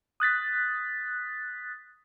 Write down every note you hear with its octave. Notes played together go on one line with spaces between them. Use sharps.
D#6 F#6 A6 B6